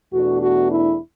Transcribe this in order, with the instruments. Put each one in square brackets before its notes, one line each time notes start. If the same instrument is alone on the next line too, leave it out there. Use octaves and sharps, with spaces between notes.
[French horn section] E2 B2 A3 D4 F#4
F#4
E4